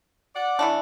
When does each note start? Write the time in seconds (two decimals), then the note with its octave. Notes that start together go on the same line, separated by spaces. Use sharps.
0.35 D5 F#5
0.59 E3 A3 D4